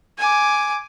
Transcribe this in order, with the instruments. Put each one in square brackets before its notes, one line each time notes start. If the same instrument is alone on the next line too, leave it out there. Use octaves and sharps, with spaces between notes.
[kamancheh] G#5 D6